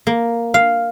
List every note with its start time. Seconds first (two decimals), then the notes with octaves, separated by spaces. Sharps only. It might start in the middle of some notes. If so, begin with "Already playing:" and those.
0.07 A#3
0.54 F5